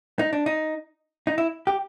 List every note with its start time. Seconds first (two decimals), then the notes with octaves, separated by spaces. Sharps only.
0.19 D#4
0.33 D4
0.46 D#4
1.27 D#4
1.38 E4
1.67 G4